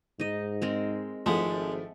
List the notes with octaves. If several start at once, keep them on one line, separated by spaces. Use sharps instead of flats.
G#2 D#4 D#5
G#3 C4 A#4
G#1 F3 G#3 A3 E4 E5 F#5